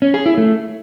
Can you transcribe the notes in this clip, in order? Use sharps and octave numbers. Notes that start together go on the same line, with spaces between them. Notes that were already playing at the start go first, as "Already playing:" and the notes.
C#4
G#4
E4
A3